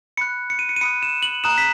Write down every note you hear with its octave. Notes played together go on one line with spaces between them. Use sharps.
B5 F#6 C#7
C#7
D#7
C#7
D#7
B5 D#6 F#6 C#7
E7
F#7
A#5 D#6 F#6 E7
B6